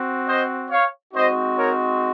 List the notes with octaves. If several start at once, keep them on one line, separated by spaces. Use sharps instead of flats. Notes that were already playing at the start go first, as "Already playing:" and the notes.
Already playing: C4 F#4
C5 D#5
C#5 F5
G#3 C4 D#4 F#4 C5 D#5
A#4 C#5